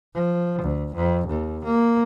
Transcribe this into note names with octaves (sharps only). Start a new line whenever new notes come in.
F3
D2
F2
D#2
A#3